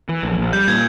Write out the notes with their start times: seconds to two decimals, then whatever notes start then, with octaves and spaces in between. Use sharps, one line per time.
0.09 E3
0.23 A#1
0.38 A#1
0.53 G3 G6
0.68 A#2 G#6